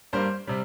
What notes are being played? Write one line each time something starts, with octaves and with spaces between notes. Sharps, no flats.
G2 G3 A#3 C5
C3 G3